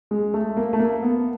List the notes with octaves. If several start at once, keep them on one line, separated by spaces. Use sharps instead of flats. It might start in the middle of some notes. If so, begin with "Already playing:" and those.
G#3
A3
A#3
A3
A#3
B3